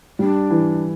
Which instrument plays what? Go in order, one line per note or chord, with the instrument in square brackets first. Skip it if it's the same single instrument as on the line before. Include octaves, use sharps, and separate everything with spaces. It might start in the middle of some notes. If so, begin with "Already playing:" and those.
[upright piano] G3 [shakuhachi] D4
[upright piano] E3